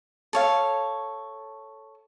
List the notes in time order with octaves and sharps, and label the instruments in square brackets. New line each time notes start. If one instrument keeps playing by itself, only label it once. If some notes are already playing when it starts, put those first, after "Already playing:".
[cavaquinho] A4 C#5 F5